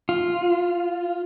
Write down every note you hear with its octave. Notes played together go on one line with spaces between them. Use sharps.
F4